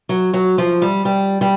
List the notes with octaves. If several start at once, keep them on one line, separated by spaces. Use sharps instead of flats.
F#3
F#3
F3
G3
G3
G3